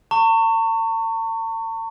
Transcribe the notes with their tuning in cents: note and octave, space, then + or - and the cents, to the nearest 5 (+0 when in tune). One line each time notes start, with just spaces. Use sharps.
A5 +45 C#6 +0